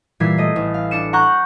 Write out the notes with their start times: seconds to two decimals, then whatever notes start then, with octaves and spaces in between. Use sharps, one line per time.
0.20 A#2 E3 G3 G#6 B6 C7
0.38 A3 D#5
0.56 A1
0.74 F5
0.91 D4 C#7 E7
1.13 F#5 A#5 C#6 F#6 G6